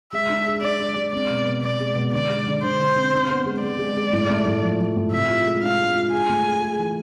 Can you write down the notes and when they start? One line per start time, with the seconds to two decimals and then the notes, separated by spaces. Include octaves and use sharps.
0.13 G#3 E5
0.30 D4
0.46 G#4
0.62 D4 D5
0.79 G#3
0.96 G#3
1.13 C4 D5
1.30 B2
1.45 B2
1.62 B2 D5
1.80 G#3
1.95 B2
2.13 D3 D5
2.29 G#3
2.46 D3
2.63 D3 C5
2.80 D3
2.96 C4
3.13 D4
3.29 B3
3.46 G#3
3.62 G#3 D5
3.79 G#3
3.97 G#3
4.13 A2
4.29 A3
4.46 A2
4.63 F3
4.79 F3
4.96 A2
5.12 C3 E5
5.29 F4
5.46 G#3
5.62 D4 F5
5.79 G#3
5.96 F4
6.12 G#4 G#5
6.29 A3
6.46 G#4
6.62 G#4
6.79 E3